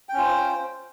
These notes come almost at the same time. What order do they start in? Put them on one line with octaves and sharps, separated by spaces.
G5 C#4 F4 C5